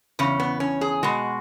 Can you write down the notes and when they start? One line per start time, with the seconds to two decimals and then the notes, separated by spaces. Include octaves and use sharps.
0.19 E2 C#3 C#4
0.40 B3
0.60 C#4
0.81 G#4
1.03 B2 G#3 F#4